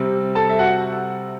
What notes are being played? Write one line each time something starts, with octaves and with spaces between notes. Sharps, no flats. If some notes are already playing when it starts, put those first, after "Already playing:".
Already playing: C3 G3 C4
A4 A5
E5
F#4 F#5